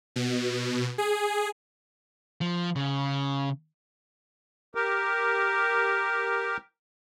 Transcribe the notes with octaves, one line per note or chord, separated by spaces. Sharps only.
B2
G#4
F3
C#3
G4 A#4